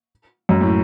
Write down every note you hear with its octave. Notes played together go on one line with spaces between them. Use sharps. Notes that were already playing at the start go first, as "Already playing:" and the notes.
F#2
A2